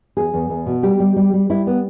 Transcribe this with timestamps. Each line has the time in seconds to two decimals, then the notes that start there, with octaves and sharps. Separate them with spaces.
0.17 E2 G#4
0.33 E2
0.50 E2
0.66 B2
0.83 G3 G4
1.00 G3
1.16 G3
1.33 G3
1.50 G3 E4
1.67 B3